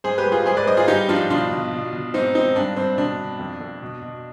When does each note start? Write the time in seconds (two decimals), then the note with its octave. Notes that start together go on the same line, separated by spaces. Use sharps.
0.04 G#2 G#4 C5
0.18 G4 B4
0.26 G#2
0.32 F4 G#4
0.46 G#2 G#4 C5
0.57 B4 D5
0.67 G#2 C5 D#5
0.77 F4 G#4
0.88 G2 D#4 G4
1.09 F3 D4 F4
1.30 B2 D4 F4
1.51 B2
1.72 B2
1.93 B2
2.14 G#2 C4 D#4
2.35 G#2 C4 D#4
2.56 G2 D4
2.76 G2 C4
2.98 B2 D4
3.19 B2
3.39 F2
3.61 F2
3.82 B2
4.02 B2